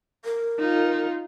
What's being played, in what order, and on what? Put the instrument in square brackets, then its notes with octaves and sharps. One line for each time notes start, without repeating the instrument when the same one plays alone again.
[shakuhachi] A#4
[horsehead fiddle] D#4 F4